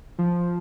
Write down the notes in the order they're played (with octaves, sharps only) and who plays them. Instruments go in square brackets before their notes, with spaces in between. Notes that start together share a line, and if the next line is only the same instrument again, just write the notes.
[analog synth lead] F3